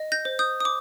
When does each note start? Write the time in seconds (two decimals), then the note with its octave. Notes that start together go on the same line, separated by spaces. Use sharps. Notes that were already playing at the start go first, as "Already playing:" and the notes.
Already playing: D#5
0.12 G6 A#6
0.25 C5
0.39 D#6 G6
0.60 D#6
0.65 D6